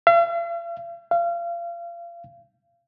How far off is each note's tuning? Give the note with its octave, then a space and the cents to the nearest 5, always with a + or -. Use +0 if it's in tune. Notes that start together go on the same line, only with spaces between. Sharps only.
F5 -45
F5 -30